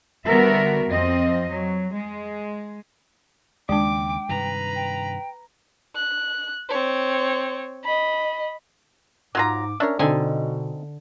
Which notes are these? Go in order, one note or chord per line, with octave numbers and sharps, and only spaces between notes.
D3 G3 B3 F#4 A#4 E5
F2 F3 C4 D#5
F#3
G#3
D#2 C#3 G#3 D4 G5 D6
G2 C3 D#3 B4 A#5
G5
F#6
C4 C#5
D#5 B5
G#2 F#3 F4 A#5 D6
C#4 D4 A#4 C#5 E5
B2 D3 C4 D#4 A4 G#5